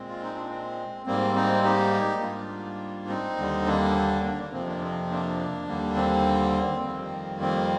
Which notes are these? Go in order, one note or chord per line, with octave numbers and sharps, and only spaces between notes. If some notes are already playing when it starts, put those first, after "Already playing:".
Already playing: A#2 G#3 C4
F4
D#4
D4
C4
G#2 G3 A#3 C4
C4 D#4
D#4 G4
G#2 G3 A#3 D4 F4
C4 D#4
D#2 D3 G3
A#3 D4
A#3 D4
A#3
F2 C3 F3 A#3 C4
A#3 D4
C4
A#3 D4
D#2 D3 G3 A#3
C4
F2 D#3 G3 A#3 C4
C4